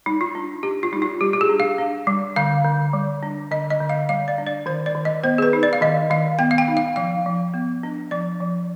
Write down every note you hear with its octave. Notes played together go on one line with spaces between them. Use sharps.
G3 D#4
F4
D4
D4 G4
F4
G3 D#4
F4
G3 G4
G4
G#4
D4
F5
D4
G3
D3 F5
D3
G3
D4
D3 D#5
D#5
D3
F5
G3 F5
D5
D4
D5
D#3 C5
D5
D#3
D#5
B3 C5
G#4
B4
D#4
D5
F5
D#3 D#5
D#3 F5
B3 G5
F5
G5
D#4
F5
F3 F5
F3
B3
D4
F3 D5
F3